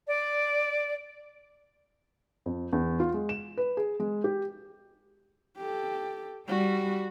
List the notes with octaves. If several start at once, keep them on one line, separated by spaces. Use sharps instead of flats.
D5
F2
E2
F4
G#3
E7
B4
G#4
G#3
G4
G4 A4
G3 F#4